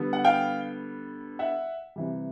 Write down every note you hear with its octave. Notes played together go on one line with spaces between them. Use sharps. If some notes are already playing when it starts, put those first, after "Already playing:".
Already playing: D3 G3 B3
F#5
F5 G5
E5 F#5
C3 E3 G3